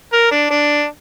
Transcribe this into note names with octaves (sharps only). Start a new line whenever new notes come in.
A#4
D4
D4